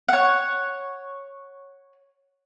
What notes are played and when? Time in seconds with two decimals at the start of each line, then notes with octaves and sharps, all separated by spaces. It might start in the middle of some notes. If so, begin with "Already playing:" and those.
0.09 C#5 F#5